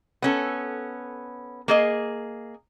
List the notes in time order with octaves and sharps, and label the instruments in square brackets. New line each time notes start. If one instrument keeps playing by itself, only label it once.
[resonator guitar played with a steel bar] B3 C#4 A4
A#3 G#4 D#5